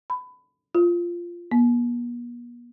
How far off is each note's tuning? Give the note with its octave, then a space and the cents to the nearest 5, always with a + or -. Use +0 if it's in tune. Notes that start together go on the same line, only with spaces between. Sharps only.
B5 +20
F4 -10
B3 -45